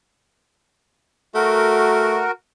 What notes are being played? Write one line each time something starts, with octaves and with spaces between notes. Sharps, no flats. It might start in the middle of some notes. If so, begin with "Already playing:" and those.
A3 F#4 A#4